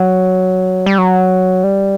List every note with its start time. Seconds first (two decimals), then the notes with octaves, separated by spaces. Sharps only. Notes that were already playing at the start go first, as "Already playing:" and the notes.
Already playing: F#3
0.86 G3
0.98 F#3
1.64 G3